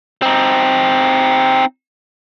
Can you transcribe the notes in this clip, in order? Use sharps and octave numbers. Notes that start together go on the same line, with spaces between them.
C4 D#4